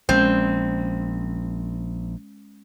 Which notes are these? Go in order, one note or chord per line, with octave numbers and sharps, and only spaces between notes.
A#1 G#3 C4 C#4